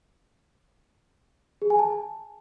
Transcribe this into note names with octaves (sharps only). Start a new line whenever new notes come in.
G#4
G#5
A5